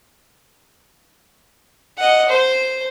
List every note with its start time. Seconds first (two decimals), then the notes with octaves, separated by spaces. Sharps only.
1.98 D#5 F#5
2.28 C5